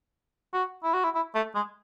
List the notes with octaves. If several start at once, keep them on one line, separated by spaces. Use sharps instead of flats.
F#4
E4
F#4
E4
E4
A3
G#3